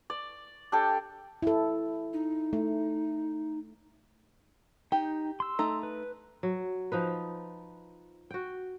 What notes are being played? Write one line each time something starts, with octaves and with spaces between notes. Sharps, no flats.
D5
D4 G4 A4 G5
E4 A4
D#4
A3
D#4 G4
C6 E6
A3 D#4 A#5
B4
F#3
F3 D#4 B4
F#4 G5